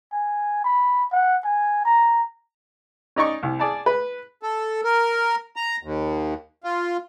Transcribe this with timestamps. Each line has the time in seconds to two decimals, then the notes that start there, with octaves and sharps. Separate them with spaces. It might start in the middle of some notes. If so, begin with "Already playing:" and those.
0.12 G#5
0.64 B5
1.13 F#5
1.44 G#5
1.85 A#5
3.16 C#4 D#4 D5 C#6
3.43 C2
3.60 G#4 D5 A5
3.86 B4
4.43 A4
4.84 A#4
5.56 A#5
5.83 D#2
6.64 F4